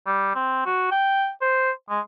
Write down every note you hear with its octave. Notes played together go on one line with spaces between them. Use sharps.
G3
C4
F#4
G5
C5
G#3